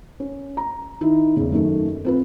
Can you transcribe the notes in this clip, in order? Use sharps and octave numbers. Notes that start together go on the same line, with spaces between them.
C#4
A#5
D#3 D#4 E4
E2 C#3
F#2 D#3 A3
C4 F4 B4